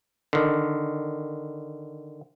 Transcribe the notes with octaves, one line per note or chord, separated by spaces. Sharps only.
D3 D#3